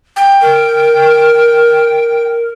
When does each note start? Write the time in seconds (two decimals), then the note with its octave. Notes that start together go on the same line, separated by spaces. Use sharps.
0.16 G5
0.41 A#4